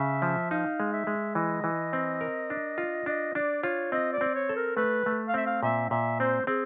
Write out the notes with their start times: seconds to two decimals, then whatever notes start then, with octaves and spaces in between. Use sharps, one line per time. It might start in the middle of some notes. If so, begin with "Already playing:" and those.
Already playing: C#3 E5
0.22 F3
0.51 D#4 F5
0.80 G#3
0.93 E5
1.07 G#3
1.35 E3 D#5
1.64 E3
1.93 C4
2.21 A#4
2.50 D4
2.78 F4
3.06 D4 D#5
3.35 D4 D5
3.63 F4 C#5
3.92 C4 D#5
4.13 D5
4.21 C4
4.35 C#5
4.49 A4
4.56 A#4
4.77 A3 B4
5.06 A3
5.28 F5
5.34 C4 E5
5.46 F5
5.63 A#2 E5
5.90 A#2 E5
6.20 C4 C5
6.47 C4 G#4